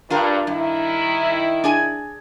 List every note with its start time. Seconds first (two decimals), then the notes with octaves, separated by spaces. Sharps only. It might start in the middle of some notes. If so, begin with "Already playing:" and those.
0.10 G2 D4 F4 A#4
0.47 G2 D#3 E4
1.64 D4 G#4 G#5